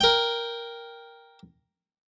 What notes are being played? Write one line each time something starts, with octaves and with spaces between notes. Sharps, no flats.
A#4 G5